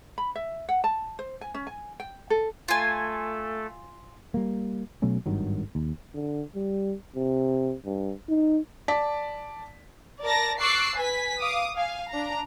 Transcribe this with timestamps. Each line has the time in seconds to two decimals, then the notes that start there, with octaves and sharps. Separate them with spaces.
0.18 B5
0.35 E5
0.69 F#5
0.84 A5
1.19 C5
1.41 G#5
1.54 C#4
1.67 G#5
2.00 G5
2.30 A4
2.68 A3 F4 A4 G#5
4.34 G3 A#3
5.02 B2 F#3 A3 C#4
5.26 G#1 G2 D#3 F#3
5.75 D#2
6.14 D3
6.55 G3
7.16 C3
7.85 G2
8.29 D#4
8.88 D5 A5 B6
10.22 A#4 D5 A5 A6 A#6
10.60 C#6 D6 E6 F#6 A6 C7
10.95 B4 G#5 B6
11.40 F5 D6 D#6
11.75 F5 G#5
12.09 D4 A#5